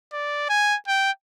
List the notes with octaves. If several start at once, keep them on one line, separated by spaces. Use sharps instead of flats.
D5
G#5
G5